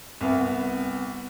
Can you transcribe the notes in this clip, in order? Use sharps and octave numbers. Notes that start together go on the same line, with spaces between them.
C2 B3